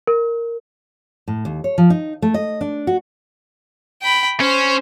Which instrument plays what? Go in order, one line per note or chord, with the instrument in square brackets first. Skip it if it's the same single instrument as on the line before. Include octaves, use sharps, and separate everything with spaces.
[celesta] A#4
[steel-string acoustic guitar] A2
D#2
C#5
F3
D#4
A3
D#5
D4
F#4
[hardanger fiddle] G5 B5
[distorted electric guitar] C#4 [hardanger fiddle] C5